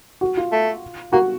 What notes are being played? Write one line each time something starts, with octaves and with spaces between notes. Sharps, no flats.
F#4
F4
A3
A#3 F#4